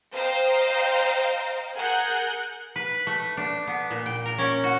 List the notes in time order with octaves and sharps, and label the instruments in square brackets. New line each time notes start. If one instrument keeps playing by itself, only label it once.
[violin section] C5 D#5 F5 G5 A#5
G#4 A#4 F#5 F#6 G6
[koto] B4
A3
D4
B3
A#2
G5
A#4
C#4
F#4